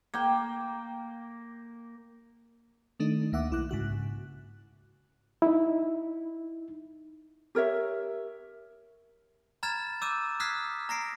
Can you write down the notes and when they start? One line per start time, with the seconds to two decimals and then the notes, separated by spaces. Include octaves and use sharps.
0.14 A#3 G5
3.00 D#3 A3 D4 D#4
3.32 D2 A#3 E5 F#5 D6
3.51 B1 E4 D6 F#6
3.69 G#2 C#3 F#4 F#6
5.42 D#4 E4
7.55 G4 A#4 C#5 E5
9.63 A#5 B5 F6 G#6 A6 E7
10.02 D6 E6 G6 D#7 E7
10.40 D#6 F6 F#6 G#6 B6 C7
10.89 A#5 A#6 C7 D7